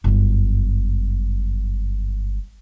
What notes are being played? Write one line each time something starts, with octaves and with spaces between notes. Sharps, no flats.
G1 F#2